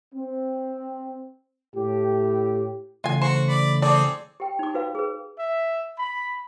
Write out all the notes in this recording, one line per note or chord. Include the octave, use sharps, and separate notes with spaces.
C4
A2 G4
C#3 E3 A3 F4 G#5
F#4 C5
D5 B5
C4 G#4 A4 D5
G4 G5
D#4 D6
F#4 B4 F5
G#4 B4
E5
B5